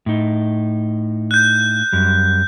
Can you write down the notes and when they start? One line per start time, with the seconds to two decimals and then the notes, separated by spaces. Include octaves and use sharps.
0.06 A2 D#4
1.31 F#6 G6
1.93 F#2 G3